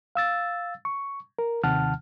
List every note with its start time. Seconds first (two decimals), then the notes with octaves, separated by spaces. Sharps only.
0.15 F5 E6 A6
0.85 C#6
1.39 A#4
1.64 D#2 C3 D#3 F#5 A5 F6